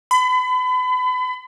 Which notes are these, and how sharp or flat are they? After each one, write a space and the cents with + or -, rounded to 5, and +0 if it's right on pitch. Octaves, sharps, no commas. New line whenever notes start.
B5 +35